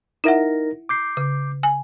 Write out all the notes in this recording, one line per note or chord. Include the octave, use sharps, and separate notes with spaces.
D#4 E4 A#4 E5 F#5 A#6
D6 G6 C7
C#3
G#5